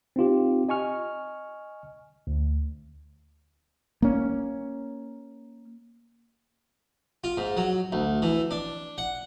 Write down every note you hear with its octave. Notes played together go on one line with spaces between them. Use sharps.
C4 D#4 F4 G4
D#5 G#5 C#6 F6
D2
A#3 C#4
F4
G#2
F#3
D2
E3
D4
F#5